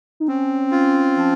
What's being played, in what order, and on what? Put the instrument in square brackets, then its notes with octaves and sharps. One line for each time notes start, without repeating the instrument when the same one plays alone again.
[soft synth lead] D#4
[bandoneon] C4 [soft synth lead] C#4
[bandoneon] F4
F3